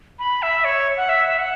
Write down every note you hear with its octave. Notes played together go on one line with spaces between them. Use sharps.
B5
E5
C#5
F#5
E5
E5
F#5